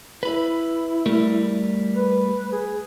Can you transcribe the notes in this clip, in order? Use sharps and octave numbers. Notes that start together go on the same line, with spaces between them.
E4 B4 B5
G3 A3 A#4
B4
G#4